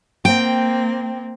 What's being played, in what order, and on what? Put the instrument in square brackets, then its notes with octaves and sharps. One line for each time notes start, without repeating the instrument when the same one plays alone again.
[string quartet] A#3 C4 [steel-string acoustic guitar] G5